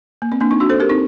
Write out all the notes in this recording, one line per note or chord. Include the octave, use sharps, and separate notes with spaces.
A#3
C4
A#3 D4
C4 D#4
D4 F#4
A4 C5
G4 A#4
C4 D#4